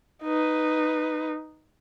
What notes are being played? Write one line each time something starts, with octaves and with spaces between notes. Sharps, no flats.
D#4 B4